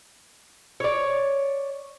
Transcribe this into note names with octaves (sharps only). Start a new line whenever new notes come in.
C#5 D5